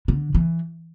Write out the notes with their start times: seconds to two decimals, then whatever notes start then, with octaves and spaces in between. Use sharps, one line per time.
0.08 D3
0.35 E3